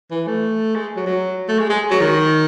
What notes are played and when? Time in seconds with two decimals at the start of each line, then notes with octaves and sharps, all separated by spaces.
0.11 E3
0.27 A3
0.75 G#3
0.96 F#3
1.07 F#3
1.48 A3
1.59 G#3
1.70 G#3
1.91 F#3
2.01 D#3